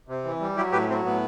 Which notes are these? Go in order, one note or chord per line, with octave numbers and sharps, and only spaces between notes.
C3
E3
G3
F#3 E4 G4
A2 G4 B4
F#3 C4
A2 B3